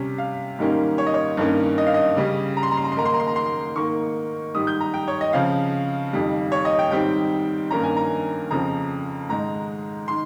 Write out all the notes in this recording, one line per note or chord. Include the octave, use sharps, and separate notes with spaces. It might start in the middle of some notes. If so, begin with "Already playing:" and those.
Already playing: C3 G3 C#4
F5
G#2 D#3 G3 A#3 C#4
C#5
D#5
C#5
G2 D#3 A#3 C#4
D#5
F5
D#5
C#3 G3 C#4
A#5
C6
A#5
C6
A#5
C6
G#2 D#3 A#3 A#5
C6
A#5
C6
A#5
C6
G#2 D#3 A#3 C#6
G#2 D#3 G3 D#6
G6
A#5
G5
C#5
D#5
C#3 F3 C4 F5
F2 D#3 G3
C#5
D#5
G5
G#2 D#3 G3 C4 G5
G2 D#3 A#3 C#4 A#5
G#5
A#5
F2 C#3 F3 C4 A#5
G#2 D#3 G#3 A#5
D#3 C6